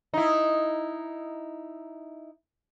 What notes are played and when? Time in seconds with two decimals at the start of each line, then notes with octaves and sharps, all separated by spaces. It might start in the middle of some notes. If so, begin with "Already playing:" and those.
0.14 D#4 E4